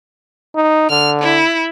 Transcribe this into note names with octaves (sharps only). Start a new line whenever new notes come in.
D#4
D3 F6
E4